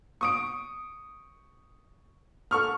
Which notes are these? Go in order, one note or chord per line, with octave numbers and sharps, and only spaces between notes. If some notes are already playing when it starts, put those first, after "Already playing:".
C#6 D#6 D7
A4 C#6 F6